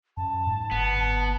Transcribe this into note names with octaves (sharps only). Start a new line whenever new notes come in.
F#2 A5
G#2
G1 B3